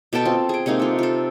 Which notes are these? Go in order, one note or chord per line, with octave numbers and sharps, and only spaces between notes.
B2 A4 G5 A5
C4 F4
G#4 G5
C3 G#3 A#3 D#4
F4 A4
F4 A4